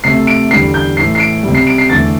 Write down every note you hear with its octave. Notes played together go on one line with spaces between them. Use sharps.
C3 A3 C7
D7
E2 D3 G3 C7
G6
A2 E3 A3 C7
C7
D7
G3
C3
C7
D7
C7
E2 D3 A3 A6